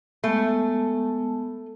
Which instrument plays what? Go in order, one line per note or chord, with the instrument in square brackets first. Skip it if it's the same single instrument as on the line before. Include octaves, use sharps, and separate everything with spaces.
[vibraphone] G#3 B3 A5 [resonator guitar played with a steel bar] A3